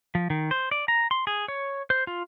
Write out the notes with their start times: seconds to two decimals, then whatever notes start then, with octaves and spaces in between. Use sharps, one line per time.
0.15 F3
0.30 D#3
0.51 C5
0.71 D5
0.88 A#5
1.11 C6
1.27 G#4
1.48 C#5
1.90 C5
2.07 F4